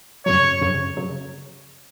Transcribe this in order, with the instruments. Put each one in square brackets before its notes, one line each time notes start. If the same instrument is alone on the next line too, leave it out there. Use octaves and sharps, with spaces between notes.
[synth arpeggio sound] F#2 C#3 F#3 [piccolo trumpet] C#5
[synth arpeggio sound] F#2 C#3 F#3
C#3 F#3